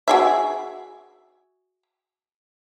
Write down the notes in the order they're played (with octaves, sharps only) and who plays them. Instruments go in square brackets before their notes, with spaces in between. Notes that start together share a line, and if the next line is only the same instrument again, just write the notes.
[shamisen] F#4 G#4 E5